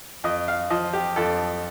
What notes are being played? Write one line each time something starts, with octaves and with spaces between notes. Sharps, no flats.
F2 D#5
F5
F3 D#5
G4
F2 A4